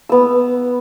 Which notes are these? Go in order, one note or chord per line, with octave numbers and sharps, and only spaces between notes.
B3 E6